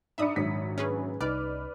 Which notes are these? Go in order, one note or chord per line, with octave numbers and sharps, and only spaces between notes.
G#2 D4 E5 B5 D#6 C#7
A#1 G#2 D#3 F#3 B6
C#4 G#4 B4
C2 D#4 B4 D5 F6